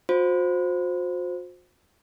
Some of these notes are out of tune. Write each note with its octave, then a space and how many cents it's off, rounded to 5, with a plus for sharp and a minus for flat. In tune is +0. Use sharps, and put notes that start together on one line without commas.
F#4 -45 C5 +0